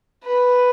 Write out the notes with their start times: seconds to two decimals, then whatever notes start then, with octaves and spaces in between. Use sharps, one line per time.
0.25 B4